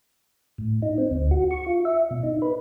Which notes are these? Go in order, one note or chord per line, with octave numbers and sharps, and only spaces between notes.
A2
D#4
C4
D2
F#4
C#6
F4
E5
B2
D#4
B4